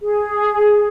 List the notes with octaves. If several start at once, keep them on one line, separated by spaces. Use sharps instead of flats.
G#4